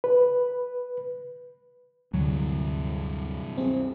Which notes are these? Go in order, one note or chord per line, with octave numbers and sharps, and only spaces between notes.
B4
D2 G2 C3 F#3 G3
C4 G#4